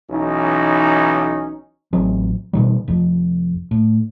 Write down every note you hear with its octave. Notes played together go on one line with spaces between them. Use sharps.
B1 E3 C#4 D#4
A1 F#3 C4
B2 D#3 G3
F1 F2
A2